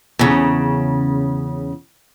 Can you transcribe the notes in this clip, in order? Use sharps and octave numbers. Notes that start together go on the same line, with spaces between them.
E2 C#3